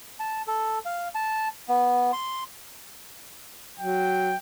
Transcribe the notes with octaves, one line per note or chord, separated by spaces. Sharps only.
A5
A4
F5
A5
B3
C6
F#3 G5